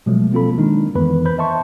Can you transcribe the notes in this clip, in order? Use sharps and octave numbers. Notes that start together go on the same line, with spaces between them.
B2 F3 F#3 G#3 A3
A#3 C4 F4 A4 B5
D#3 G#3 D4 D#4
F2 D#3 E3 B3 B4 B5
B4 C5 B5 G6
D#5 E5 A5 C6 C#6